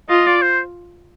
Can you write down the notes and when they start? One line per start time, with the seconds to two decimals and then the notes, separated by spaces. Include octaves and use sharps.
0.09 F4 D#5
0.26 D5
0.42 C5